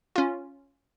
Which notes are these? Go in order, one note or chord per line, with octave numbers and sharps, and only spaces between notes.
C#4 F4